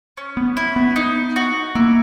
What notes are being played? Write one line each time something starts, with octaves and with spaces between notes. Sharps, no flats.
C#4
B3
E4
B3
D#4
F#4
A#3 E4